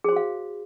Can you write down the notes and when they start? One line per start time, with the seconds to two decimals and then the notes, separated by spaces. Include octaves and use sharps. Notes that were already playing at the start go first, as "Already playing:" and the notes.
0.04 G#4
0.08 C5
0.12 F#4
0.16 F5